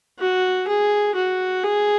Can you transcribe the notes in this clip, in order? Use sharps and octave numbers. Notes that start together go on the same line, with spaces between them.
F#4
G#4
F#4
G#4